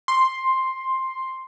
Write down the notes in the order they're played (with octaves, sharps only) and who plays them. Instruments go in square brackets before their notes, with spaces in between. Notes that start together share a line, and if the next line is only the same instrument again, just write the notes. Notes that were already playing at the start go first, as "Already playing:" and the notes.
[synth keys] C6